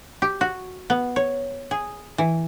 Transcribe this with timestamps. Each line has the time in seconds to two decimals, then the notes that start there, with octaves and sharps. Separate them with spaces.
0.22 G4
0.41 F#4
0.90 B3
1.16 C#5
1.71 G#4
2.18 E3